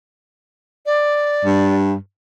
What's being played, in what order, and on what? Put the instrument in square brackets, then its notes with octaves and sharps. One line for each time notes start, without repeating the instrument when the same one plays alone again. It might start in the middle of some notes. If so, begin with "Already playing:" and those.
[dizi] D5
[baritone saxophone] G2